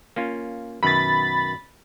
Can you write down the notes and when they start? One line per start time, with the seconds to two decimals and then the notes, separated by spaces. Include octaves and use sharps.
0.16 A#3 C#4 F4
0.83 F#2 B2 D#3 B5 A6